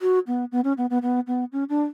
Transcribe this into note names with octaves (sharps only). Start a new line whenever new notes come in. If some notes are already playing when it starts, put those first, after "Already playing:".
F#4
B3
B3
C#4
B3
B3
B3
B3
C#4
D4